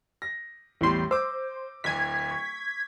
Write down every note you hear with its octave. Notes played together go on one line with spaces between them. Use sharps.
A#6
A1 E2 A2 G3 C6
C5 D6 E6
D1 G#5 G#6 B6
C#6